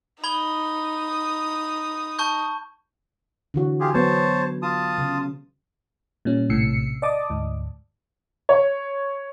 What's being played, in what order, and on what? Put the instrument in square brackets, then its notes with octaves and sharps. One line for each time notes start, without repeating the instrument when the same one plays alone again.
[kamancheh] D#4 D#6 [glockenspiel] B5 G#6 G7
[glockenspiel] A5 C#6 G6
[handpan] D3 E3 F#4
[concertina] F4 G4 G#4
[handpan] F#3 B3 [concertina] C5 C#5 A5
[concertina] F4 A5 D#6
[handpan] C#3
[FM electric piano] A#2 G3 C#4
A#1 A2 C3 E6 C7 C#7
D5 D#5 A5 D6 D#6
D2 G#2
[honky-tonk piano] C#5